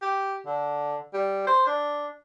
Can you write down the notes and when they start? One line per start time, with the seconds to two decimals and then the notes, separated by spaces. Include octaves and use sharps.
0.02 G4
0.47 D3
1.14 G3
1.47 C5
1.67 D4